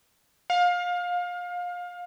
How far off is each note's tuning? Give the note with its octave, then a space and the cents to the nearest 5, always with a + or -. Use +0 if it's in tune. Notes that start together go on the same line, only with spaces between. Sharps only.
F5 +25